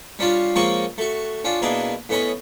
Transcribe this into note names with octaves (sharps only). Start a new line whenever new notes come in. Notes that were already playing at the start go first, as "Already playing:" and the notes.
G3 C#4 D4 F4 F5
F3 G#3 A#3 C4 C#4 C#6
A3 F#4
C#4 D4 F4
B2 A#3 D4 E4 G#4
A2 B3 C#4 D#5 B5